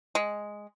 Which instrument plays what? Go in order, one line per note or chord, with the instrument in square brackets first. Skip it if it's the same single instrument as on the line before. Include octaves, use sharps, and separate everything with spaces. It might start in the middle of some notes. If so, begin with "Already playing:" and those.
[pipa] G#3